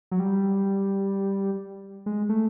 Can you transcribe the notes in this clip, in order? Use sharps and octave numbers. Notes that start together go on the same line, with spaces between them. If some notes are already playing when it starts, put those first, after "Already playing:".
F#3
G3
G#3
A3